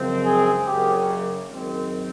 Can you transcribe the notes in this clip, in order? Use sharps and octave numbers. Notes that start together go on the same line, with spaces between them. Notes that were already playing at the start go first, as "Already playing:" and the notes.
Already playing: F#2 C#3 F3 G#3 C4
G#4
F#1 F#2 C#3 G4
F#1 F#2 D#3 G#3 C4